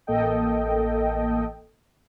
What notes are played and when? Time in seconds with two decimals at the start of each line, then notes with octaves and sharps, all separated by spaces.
0.07 A1 A#3 A4 D#5 G5